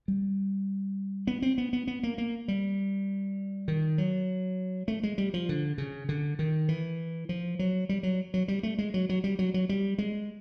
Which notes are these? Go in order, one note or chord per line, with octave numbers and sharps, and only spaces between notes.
G3
B3
C4
B3
B3
B3
A#3
A#3
G3
D#3
F#3
A3
G#3
G3
F3
D3
C#3
D3
D#3
E3
F3
F#3
G3
F#3
F#3
G3
A3
G#3
F#3
F#3
G3
F#3
F#3
G3
G#3